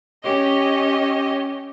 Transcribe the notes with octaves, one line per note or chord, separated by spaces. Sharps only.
C#4 G4 C#5 D#5